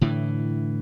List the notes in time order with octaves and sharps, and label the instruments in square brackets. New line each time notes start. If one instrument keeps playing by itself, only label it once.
[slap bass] A2 D3 E3